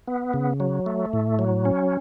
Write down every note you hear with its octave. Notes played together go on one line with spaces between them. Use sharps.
B3
C#3
F#3
A3
A2
F#3
C#4